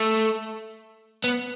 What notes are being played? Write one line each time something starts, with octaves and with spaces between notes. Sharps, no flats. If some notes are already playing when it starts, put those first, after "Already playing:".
Already playing: A3
B3